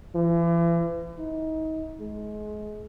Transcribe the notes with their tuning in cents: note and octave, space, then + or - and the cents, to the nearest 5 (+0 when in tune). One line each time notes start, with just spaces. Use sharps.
E3 +40
D#4 +30
G#3 +30